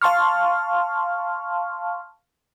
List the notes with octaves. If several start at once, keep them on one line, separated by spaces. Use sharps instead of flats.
F5 A5 C6 C#6 F6